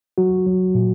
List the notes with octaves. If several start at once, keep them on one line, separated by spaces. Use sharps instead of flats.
F#3 F#4
F#3
A#2